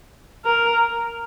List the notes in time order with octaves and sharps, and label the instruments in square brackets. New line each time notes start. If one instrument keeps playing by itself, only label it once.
[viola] A#4